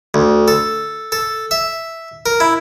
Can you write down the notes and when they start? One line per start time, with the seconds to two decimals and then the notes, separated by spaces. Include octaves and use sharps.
0.14 D2
0.48 A4
1.12 A4
1.51 E5
2.26 A#4
2.40 E4